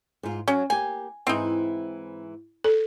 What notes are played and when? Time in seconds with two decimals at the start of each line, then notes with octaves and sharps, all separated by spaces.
0.23 G#2 F4
0.48 F#3 C#4
0.70 A#3 G4 G#5
1.27 G#2 E3 C4 D#4 E4
2.64 A4